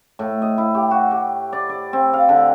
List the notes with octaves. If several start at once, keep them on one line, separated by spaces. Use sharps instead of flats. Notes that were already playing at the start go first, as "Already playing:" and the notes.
A2
D#5
E4
G4
F#4
G4
D5
D5
C4
F5
D3